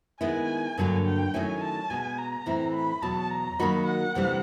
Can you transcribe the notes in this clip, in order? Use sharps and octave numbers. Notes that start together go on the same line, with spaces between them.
D#3 G#3 B3 E4 G#5
G2 D3 F#3 A#3 D4
G5
D#3 F#3 A3 C#4 E4 G#5
A5
B2 G#3 B3 G#5
A#5
A2 E3 A3 C4 E4
B5
E2 B2 F#3 A5
A#5
D#3 F#3 A#3 D#4 F#4 B5
F#5
D2 C3 E3 G3 C4